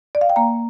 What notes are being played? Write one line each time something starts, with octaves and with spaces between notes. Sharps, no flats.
D5
F5
G5
A#3 A#5